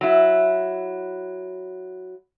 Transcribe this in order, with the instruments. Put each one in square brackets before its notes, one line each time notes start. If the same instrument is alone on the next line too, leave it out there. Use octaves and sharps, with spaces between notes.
[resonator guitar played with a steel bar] F#3 E4